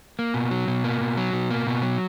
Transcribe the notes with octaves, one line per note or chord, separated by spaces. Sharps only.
A#3
B2
F#3
B2
A#3
B2
F#3
B2
A#3
B2
F#3